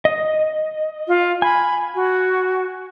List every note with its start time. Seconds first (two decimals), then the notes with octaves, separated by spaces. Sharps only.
0.05 D#5
1.08 F4
1.42 G#5 B5
1.95 F#4